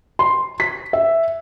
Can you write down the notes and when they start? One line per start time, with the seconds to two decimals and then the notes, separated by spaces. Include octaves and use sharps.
0.19 C6
0.60 B6
0.93 E5